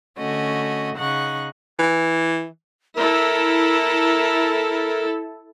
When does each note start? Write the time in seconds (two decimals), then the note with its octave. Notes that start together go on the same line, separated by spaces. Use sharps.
0.18 D3 A3 C#4 F#4 D#5
0.96 C#3 D#4 F#5 C#6 F#6
1.79 E3
2.96 E4 A4 A#4